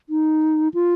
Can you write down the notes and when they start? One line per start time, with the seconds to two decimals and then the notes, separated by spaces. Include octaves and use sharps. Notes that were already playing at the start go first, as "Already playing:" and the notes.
0.09 D#4
0.74 F4